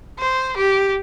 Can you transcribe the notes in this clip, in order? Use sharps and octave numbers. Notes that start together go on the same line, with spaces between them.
C5
G4